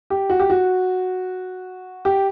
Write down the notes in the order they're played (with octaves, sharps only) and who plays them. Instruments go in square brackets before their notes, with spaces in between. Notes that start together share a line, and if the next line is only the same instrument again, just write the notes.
[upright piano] G4
F#4
G4
F#4
G4